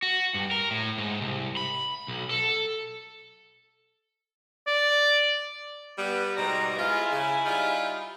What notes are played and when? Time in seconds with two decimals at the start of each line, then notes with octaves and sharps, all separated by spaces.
0.03 F#4
0.34 G2
0.51 A#4
0.71 A2
0.98 G#2
1.21 C2
1.57 B5
2.08 B1
2.31 A4
4.67 D5
5.97 G3 B3
6.37 G#2 B2 G3 A#5
6.77 G#3 E4 F4 G#5
7.11 C#3
7.46 G3 D#4 F4